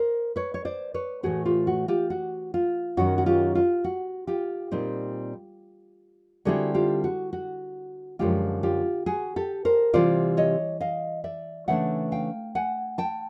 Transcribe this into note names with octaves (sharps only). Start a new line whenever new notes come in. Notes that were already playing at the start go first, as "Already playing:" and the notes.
Already playing: A#4 C5
B4 C#5
C#5
C5 D5
B4 C#5
A2 E3 A3 F#4 G#4
F4 G4
F#4
F4 G4
F#4
F4
F#2 D#3 F#3 F#4
F#4
F4 G4
F4
F#4
F4 G4
A#2 G3 C4 D#4
D3 G3 C4 E4 F#4 G#4
F4 G4
F#4
F#4
F#2 D3 F3 G#3 F4 G4
F4 G4
F#4 G#4
G4 A4
A#4 C5
C3 E3 G3 C4 F4 C5 D5
C#5 D#5
D#5 F5
D5 E5
C#3 E3 A3 D4 E5 F#5
F5 G5
F#5 G#5
G5 A5